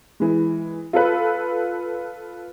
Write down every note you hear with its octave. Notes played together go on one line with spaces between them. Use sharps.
E3 G#3
F4 A4 B4